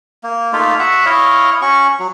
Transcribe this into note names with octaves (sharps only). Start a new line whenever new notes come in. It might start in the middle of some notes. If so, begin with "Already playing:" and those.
A#3
A3 A#3 D#4 F4
F#4 E5 F#5
E4 C#5 D#5 F5
C#4 F#4 C#6
F#3